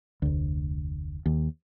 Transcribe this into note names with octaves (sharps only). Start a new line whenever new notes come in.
F1 D2
D#2